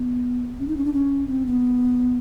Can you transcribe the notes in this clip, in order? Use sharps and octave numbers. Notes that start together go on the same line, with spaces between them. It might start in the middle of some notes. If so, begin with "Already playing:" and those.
Already playing: B3
C#4
D#4
C#4
D4
C#4
C4
B3